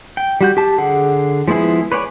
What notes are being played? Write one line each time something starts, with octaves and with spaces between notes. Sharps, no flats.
G5
G3 F#4 G6
G4 A5
D3 G#4 F#5
F3 G#3 B3 E4 G#4
B4 C#5 D5 F#5 G#5